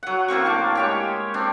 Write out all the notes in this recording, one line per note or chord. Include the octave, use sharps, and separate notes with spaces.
F#3 F#5
A2 A#3 C4 C#6
D4 D6
G#3 G4 C#5
C4 D4